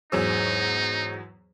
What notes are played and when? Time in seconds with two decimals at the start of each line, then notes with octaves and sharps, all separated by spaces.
0.12 E2 G#2 F#3 C#4 D#4 E6